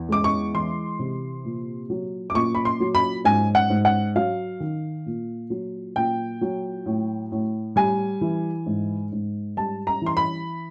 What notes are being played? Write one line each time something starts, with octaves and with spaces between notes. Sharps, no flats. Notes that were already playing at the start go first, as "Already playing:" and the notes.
Already playing: E2
G#3 D6
C#6
E3 C6
C3
A#2
F#3
D6
A#2 C#6
B5
C6
F#3
B5
G#2 G#5
F#5
G#2
F#5
F#3 F5
D#3
A#2
F#3
A#2 G5
F#3
A2
A2
G3 G#5
E3
G#2
G#2
G3 A5
A#5
E3 C6
B5